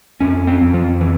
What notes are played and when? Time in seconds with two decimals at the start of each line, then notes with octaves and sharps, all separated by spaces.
0.20 F2 C#4
0.47 C4
0.61 F2
0.74 F3
1.01 E3